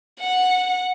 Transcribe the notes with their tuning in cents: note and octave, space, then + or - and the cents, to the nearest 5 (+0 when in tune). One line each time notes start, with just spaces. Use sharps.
F#5 -10